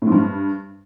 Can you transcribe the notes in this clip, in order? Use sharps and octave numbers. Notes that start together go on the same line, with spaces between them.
A2
G#2
G2